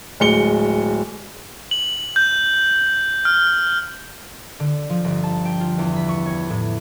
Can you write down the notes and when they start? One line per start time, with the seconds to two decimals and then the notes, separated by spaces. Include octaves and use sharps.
0.20 D1 G#3 C#7 G7
1.71 F#7
2.16 G6
3.25 F6
4.60 D3
4.90 F3
5.04 G1
5.23 A5
5.45 G5
5.61 F4
5.78 E2
5.96 B5
6.09 C#6
6.26 C#5
6.50 A2